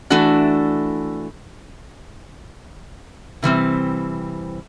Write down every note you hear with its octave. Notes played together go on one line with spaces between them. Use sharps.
E3 A3 D4 F#4
C3 E3 G3 C4